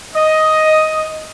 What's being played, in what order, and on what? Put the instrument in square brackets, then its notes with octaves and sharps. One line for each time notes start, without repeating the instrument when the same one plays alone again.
[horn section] D#5